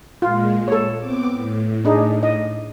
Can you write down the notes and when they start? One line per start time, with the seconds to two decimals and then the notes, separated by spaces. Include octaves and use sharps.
0.22 A#2 G#3 F4
0.68 A4 C#5
0.98 B3 C4 D6
1.31 A2
1.85 D4 D#4 G#4
2.23 D#5